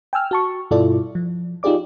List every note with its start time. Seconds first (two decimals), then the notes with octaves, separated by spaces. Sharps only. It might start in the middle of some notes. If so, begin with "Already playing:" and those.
0.13 G5 G#5 E6 F6
0.31 F#4 A5 C#6
0.71 G2 B2 E4 F4 A4 D5
1.15 F3
1.63 D#4 F4 G4 G#4 D5 D6